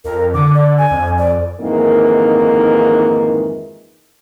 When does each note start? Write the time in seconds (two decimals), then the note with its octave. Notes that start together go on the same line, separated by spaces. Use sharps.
0.04 F2 A#4
0.34 D3 D6
0.54 D5
0.78 G#5
0.91 F2
1.18 D5
1.60 F2 G#2 D#3 E3 A#3 A#4